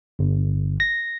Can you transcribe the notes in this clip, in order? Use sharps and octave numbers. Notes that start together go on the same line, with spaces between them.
G1
A#6